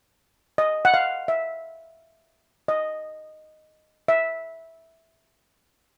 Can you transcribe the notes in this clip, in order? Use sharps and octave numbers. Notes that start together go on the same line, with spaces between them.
D#5
F#5
F5
E5
D#5
E5